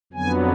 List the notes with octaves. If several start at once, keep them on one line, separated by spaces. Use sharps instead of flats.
F2 D3 F#3 B3 G#5